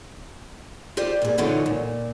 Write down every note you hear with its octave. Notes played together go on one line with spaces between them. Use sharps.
F4 G4 C5 D5
A#2 G#4
D3 E3 F#3 D#4 F4 C#5
A#2